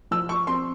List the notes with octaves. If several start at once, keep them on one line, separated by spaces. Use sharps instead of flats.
F3 E6
C#6
C4 C6